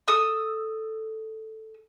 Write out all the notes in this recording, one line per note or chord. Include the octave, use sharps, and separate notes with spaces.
A4 D#6 E6